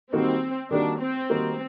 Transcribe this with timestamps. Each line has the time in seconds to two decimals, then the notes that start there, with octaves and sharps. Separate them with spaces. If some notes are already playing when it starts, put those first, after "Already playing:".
0.13 D#3 G3 A#3 C4 D#4 F#4
0.71 D#3 G3 A#3 D4 D#4 F#4
1.00 C4
1.30 D#3 G3 A#3 D#4 F#4